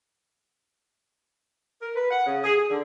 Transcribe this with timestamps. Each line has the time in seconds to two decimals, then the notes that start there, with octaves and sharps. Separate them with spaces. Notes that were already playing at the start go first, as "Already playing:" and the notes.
1.81 A#4
1.95 B4
2.11 F#5
2.26 C#3
2.44 G#4
2.57 G#4
2.70 D3